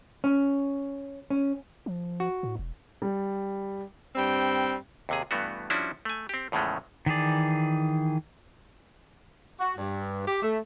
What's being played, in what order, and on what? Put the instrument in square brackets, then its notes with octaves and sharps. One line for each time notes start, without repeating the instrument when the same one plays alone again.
[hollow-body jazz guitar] C#4
C#4
[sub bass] F3
[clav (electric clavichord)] F#4
[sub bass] A2
E1
[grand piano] G3
[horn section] G2 G3 C4 G5
[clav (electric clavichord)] D#2 C3 G#4
G2 E3 A3 B3 F#4
F3 G3 C#4 D4 E4 F#4
A3 G#5
C4 G4
E2 A2 C#3 F3 G#3 A3
[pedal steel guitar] D#3 E3 G#4 D5
[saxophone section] F#4
G2
G4
A3